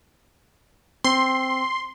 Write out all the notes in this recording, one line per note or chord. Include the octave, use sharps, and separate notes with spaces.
C4 C6